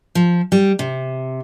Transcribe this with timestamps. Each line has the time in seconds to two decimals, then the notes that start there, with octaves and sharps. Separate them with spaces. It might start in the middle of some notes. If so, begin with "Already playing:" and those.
0.15 F3
0.52 G3
0.79 C3